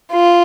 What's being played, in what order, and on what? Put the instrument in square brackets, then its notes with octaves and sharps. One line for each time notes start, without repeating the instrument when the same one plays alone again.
[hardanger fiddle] F4